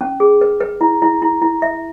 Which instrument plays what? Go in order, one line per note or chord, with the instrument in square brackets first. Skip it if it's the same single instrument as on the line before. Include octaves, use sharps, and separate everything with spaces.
[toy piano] C#4
G#4
B4
B4
E4
E4
E4
E4
E5